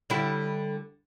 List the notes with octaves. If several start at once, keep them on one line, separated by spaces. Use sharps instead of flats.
D3 G3 E4